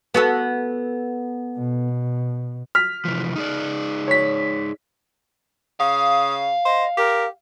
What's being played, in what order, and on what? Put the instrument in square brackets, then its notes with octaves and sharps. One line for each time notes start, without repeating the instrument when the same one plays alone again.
[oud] B3 F#4 A4
[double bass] B2
[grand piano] F6 B6
[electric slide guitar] C3 E3 F3
D#4 G#4 D5
[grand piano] C#5 B6
[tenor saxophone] C#3 [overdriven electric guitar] F5 [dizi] D#6
[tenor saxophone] C5 [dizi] D#5
[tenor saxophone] G4 [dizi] A#4